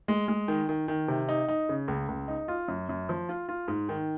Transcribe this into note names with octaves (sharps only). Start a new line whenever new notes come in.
G#3
G#3
D#3
D#3
D#3
C3
D#4
D#4
C#3
C#2
C#2
D#4
F4
F#2
F#2
F3
F4
F4
G#2
D#3